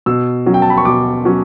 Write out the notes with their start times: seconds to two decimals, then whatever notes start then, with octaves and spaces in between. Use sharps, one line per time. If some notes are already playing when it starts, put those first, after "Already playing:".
0.06 B2 E6
0.46 F#3 C#4
0.54 G5
0.62 A5
0.70 B5
0.78 C#6
0.85 B2 D6
1.25 F#3 C#4